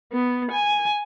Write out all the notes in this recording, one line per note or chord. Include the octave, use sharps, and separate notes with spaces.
B3
G#5